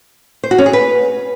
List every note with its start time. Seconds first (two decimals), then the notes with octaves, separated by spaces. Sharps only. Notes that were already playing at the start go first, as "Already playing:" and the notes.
0.43 C5
0.51 F#4
0.58 C#4
0.66 G#4
0.73 B4